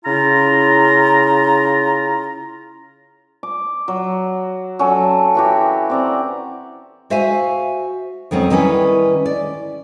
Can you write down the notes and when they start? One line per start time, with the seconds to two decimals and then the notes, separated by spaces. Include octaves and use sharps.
0.05 C#3 E4 F4 A#5
3.43 D6
3.88 F#3
4.79 F#3 C#4 A4
5.35 E3 F#4 G4
5.90 C4 D5 A#5
7.10 F#4 C5 E5 F5 G#5
8.31 F2 D#3 F#3 C4 C#4
8.51 D#3 E3 G3 C#4 B4
9.26 D5